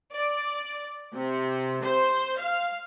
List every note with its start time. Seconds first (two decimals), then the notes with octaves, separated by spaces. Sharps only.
0.13 D5
1.14 C3
1.83 C5
2.38 F5